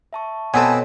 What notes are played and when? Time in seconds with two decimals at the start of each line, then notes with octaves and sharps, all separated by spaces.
0.13 E5 A5 C#6
0.54 B2 B3 C4 A4 B4 C#5 G#5 A5